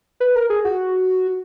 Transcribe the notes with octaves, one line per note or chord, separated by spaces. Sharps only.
B4
A#4
G#4
F#4